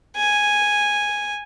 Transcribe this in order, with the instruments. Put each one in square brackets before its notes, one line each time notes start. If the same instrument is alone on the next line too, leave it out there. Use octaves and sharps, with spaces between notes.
[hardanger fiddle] G#5